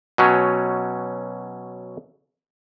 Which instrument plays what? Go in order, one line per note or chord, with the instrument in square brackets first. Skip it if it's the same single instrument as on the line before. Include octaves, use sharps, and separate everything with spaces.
[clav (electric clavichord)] B2 F#3 C#4